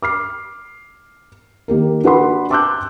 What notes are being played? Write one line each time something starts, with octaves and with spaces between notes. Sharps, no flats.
D6 F6 C7
D#3 A#3 G4 A#4
D4 F#4 B4 F#5 B5 C6
A5 C6 D6 E6 F#6 G6